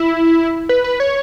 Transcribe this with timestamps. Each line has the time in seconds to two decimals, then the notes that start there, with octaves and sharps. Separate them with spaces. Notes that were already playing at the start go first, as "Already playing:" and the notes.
Already playing: E4
0.69 B4
0.84 B4
1.00 C#5